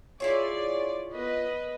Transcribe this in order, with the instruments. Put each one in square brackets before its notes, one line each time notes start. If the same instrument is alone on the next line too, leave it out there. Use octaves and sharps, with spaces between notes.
[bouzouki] E4 F4 C#5 [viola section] G#4 D5
[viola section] B3 B4 D#5